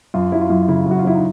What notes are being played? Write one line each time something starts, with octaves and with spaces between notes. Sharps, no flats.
F#2 F4
F#3 E4
F4
F#2 E4
C#3 E4
F#2 F#4
F4
F#3 E4
D#4